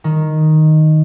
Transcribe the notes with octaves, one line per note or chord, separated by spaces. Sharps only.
D#3